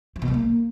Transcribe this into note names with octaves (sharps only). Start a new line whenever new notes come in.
F3
B2
G3
A#3